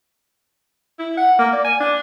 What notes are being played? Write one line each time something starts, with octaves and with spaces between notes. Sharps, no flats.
E4
F#5
A#3
D5
G#5
D4